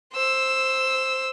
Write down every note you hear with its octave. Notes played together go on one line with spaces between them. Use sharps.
C5 E6